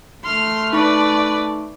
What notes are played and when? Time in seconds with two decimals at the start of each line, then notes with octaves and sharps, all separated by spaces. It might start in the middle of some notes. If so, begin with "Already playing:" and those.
0.24 A3 C6 F6
0.73 D#4 B4 D5 C#6